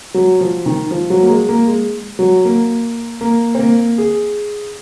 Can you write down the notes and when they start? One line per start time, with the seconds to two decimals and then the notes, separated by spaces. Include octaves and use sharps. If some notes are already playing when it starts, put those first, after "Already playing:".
0.14 F#3
0.41 F3
0.66 D#3
0.91 F3
1.10 F#3
1.23 A#3
1.29 G#3
1.49 A#3
1.67 G#3
2.19 F#3
2.45 A#3
3.21 A#3
3.55 C4
3.59 A#3
3.98 G#4